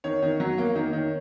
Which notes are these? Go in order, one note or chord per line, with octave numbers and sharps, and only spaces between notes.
D#3 C#5
D#3
F#3
A#3
D#3
D#3